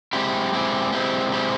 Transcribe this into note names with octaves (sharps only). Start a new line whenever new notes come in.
G#3 C4 E4 G4
G#3 C4 E4 G4
G#3 C4 E4 G4
G#3 C4 E4 G4